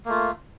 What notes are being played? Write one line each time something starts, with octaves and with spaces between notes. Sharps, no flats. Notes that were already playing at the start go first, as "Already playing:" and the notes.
A3 A#3 F4